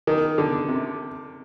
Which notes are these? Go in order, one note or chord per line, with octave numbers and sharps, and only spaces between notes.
D#3
D3
C3